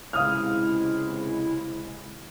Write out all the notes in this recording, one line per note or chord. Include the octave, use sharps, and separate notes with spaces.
C#2 C3 G#3 E4 F5 D#6 F6